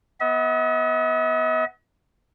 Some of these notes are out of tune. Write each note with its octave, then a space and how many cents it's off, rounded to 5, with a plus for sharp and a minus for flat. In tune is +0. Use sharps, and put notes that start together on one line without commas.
B3 +0 D#5 +45